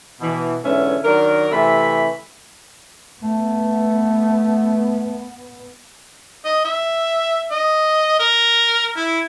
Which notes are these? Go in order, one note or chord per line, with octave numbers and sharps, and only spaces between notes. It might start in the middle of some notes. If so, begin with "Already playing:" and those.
B2 E3
G#2 D3 E3 B3 C#4 E5
D#3 F#3 D4 A#4
C3 E3 A3 E5 B5
A3 B3
D#5
E5
D#5
A#4
E4